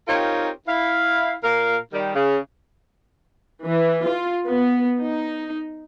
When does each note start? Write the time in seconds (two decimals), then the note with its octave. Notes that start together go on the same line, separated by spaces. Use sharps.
0.08 C4 D#4 F4 G4 A#4 C#5
0.67 E4 F5
1.42 A#2 A#4 F5
1.92 D#3 G3
2.15 C#3
3.64 E3
4.05 F4
4.46 B3
5.00 D#4